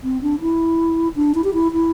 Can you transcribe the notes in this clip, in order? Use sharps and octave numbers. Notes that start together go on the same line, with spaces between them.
C4
D4
E4
D4
E4
G4
E4
E4